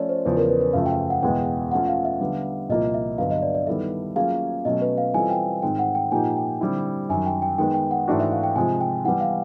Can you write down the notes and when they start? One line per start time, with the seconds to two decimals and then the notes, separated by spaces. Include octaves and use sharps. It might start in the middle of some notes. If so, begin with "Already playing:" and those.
Already playing: F3 A3 C#4 F4 C#5 D5
0.09 C5
0.25 E2 C#3 F3 B4
0.37 A#4
0.49 B4
0.61 B4
0.73 F#2 C#3 F3 A3 F5
0.86 G5
1.10 F#5
1.23 E2 B2 G#3 B3 G5
1.71 F3 A3 C#4 F4 F#5
1.88 F5
2.05 E5
2.21 D3 G3 B3
2.69 C2 A#2 F3 A#3 D#5
2.94 E5
3.18 G2 D3 F#3 B3 F5
3.31 D#5
3.42 D5
3.55 D5
3.67 D#3 G3 B3 E4 A4 E5
4.16 F#3 A#3 C#4 F4 G#4 F5
4.65 B2 F#3 A3 C#4 D#5
4.82 B4
4.98 F5
5.14 E3 G3 C4 F4 A4 G#5
5.30 G5
5.62 G#2 D#3 G#3 C4 G5
5.79 F#5
5.95 G5
6.12 A#2 F3 A#3 D#4 G4 G#5
6.37 G5
6.61 D3 G3 C4 E4
7.09 F#2 D#3 F#3 G#5
7.26 G5
7.42 G5
7.58 D#3 G#3 B3 G5
7.74 G5
7.91 F#5
8.08 G#2 E3 A3 D4 F#4
8.20 E5
8.32 F5
8.44 G5
8.56 C3 F3 G#3 G#5
8.81 G5
9.05 E3 G3 B3 E4 F#5
9.21 F5